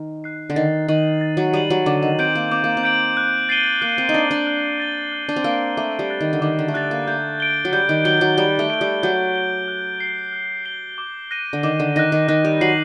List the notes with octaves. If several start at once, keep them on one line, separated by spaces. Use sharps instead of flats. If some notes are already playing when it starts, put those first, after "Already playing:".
Already playing: D#3
F#6 C7
D3
D#3 A6
D#3 D#7 F#7
A6
F#3
G3 D#7 F#7
F#3
D3 D6
D#3
C4 G6 D7 F#7
A#3
C4 D6
A#3
C4
G6 D7 F#7
F#6
A6 C7 D#7 G7
A#3 F#6
C4
D#4
D4 A6 C7 D#7 G7
D4
F#6
A6 D7 G7
F#6
D4
C4
A#3 A6 D7 G7
A3 D6
G3
F#6 A6
D#3
D3
D#3 D6
D3
A3
G3 F#6 A6
A#3
A3 G6
D7 G7
F#3
G3 G6
D#3
F#3 D7 G7
F#3
G3 G6
A3
D7 G7
G3
F#3 G6
D7 G7
F#6
C7 G7
F#6
C7 G7
D6
F#6 A#6 D#7
D3
D#3 D6
D3
D#3 F#6 A#6 D#7
D#3
D#3 F#6
G3
F#3 C7 D#7 F#7